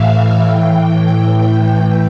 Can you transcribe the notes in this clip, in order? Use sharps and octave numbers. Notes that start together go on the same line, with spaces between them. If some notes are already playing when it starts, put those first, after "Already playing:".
Already playing: A2 E3 E5 F5
A2 E3 G5
G5